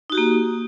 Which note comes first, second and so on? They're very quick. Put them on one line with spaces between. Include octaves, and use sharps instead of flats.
D#4 F#4 G4 A#3